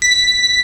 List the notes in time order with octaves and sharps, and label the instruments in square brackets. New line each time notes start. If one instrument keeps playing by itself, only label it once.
[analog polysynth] B6